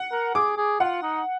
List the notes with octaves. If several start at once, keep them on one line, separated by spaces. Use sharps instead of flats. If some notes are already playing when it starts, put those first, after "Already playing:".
Already playing: F#5
A#4
G#4 D6
G#4
F4 F#5
D#4